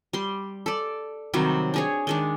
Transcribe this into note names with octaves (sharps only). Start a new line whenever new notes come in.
G3 C6
A4 D5
C3 D#3 F#3 G3
D4 G#4 C#5
D#3 G#3 D4